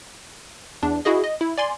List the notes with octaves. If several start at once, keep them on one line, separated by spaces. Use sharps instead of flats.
E2 D4
E4 F#4 G#4 D#5
D#5
E4
D5 G#5 C6